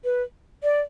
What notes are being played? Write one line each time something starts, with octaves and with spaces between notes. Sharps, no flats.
B4
D5